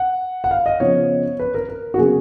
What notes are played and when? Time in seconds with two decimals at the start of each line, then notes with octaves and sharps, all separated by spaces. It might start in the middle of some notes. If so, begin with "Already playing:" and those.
Already playing: F#5
0.44 F#5
0.51 F5
0.66 D#5
0.80 C#3 F3 B3 C#5
1.40 B4
1.55 A#4
1.69 A#4
1.94 F#4
1.98 C#3 F#3 B3 G#4